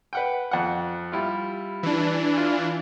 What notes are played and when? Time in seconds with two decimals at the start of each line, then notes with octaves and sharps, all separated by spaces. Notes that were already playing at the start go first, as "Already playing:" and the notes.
0.13 B4 F#5 G5
0.51 F2 F#5
1.12 G3 E4 F4
1.83 E3 D4
2.37 F4